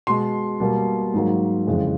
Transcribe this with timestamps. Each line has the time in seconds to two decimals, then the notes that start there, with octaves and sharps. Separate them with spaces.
0.07 B2 G#3 C6
0.60 B2 G3 A#3
1.14 G#2 D#3 F#3 A#3
1.67 F2 C#3 E3 G#3